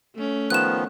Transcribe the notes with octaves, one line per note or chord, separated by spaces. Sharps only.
A3 C#4
D#3 F3 B3 F#6 E7